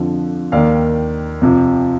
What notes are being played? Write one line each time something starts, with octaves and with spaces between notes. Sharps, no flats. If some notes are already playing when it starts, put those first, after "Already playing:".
Already playing: F2 D3 F3
D#2 D#3 D5 F5
F2 C3 F3